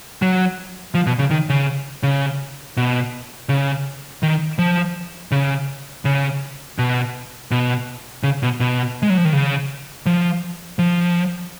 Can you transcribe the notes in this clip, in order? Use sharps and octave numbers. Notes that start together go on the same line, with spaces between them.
F#3
F3
B2
C#3
D#3
C#3
C#3
B2
C#3
D#3
F3
C#3
C#3
B2
B2
C#3
B2
B2
G#3
F#3
F3
D#3
C#3
F3
F3